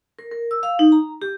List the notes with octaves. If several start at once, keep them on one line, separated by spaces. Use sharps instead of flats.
A#4
A#4
E6
F5
D#4
A#5
G4